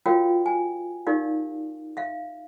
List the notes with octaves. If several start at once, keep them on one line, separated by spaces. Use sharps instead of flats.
F4 F#4 A#4 C#5 F5 G5
G#5
D#4 G4 A#4 D5 F5
E5 F5